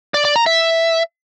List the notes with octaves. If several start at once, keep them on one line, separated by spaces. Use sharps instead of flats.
D5
D5
A#5
E5